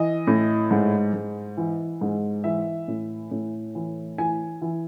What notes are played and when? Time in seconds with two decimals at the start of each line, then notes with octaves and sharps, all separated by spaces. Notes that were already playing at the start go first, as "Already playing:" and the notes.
Already playing: E3 D#5
0.27 A2
0.71 G#2
1.14 G#2
1.57 E3
2.01 G#2
2.44 E3 E5
2.88 A2
3.31 A2
3.75 E3
4.18 E3 G#5
4.62 E3